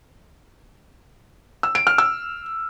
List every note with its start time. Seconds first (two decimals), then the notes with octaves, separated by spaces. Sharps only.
1.63 E6
1.75 D7
1.87 F6
1.98 E6